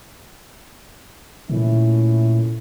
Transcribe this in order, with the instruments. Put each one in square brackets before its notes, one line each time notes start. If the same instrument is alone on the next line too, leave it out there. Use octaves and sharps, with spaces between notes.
[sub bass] A#2 [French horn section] A3 C#4 E4